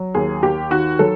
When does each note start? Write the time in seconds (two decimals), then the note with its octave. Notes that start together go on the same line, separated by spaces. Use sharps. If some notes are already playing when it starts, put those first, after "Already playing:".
Already playing: F#3
0.14 D#2 G#4
0.42 D#2 G4
0.71 D#3 F#4
0.99 F#3 A4